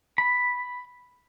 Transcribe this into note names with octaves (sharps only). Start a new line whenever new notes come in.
B5